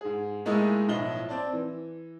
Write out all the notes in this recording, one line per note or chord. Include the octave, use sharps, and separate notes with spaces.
G#2 G#4
A#2 G#3 A3 D#4 E4
B1 A2 F3 D#5 G7
C4 D5 A5
E3